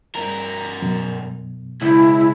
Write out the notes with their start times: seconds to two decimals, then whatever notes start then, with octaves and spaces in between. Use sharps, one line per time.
0.15 G2 A#4
0.82 F#2 B2
1.81 C#2 E4